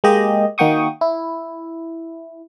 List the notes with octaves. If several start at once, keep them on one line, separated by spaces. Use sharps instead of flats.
G#3 A#3 G4 D#5
D#3 A#3 F#4 G5 C#6 D#6
E4